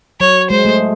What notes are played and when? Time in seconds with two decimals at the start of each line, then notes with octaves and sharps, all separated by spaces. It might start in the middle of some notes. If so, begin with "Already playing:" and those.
0.20 F#3 C#5
0.50 G#3 C5
0.65 A3